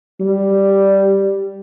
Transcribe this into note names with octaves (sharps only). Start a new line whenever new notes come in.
G3